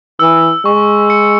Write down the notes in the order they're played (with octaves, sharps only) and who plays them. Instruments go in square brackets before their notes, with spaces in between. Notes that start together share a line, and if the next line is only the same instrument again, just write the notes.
[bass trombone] E3 [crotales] E6
[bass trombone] G#3 [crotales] C#6
[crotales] C#7